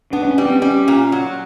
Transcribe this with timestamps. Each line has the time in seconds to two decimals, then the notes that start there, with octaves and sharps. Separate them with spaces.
0.13 B3 D4
0.25 D4
0.30 C#4
0.38 G3
0.45 C4
0.62 G3 C#4
0.88 A#2
1.12 F#3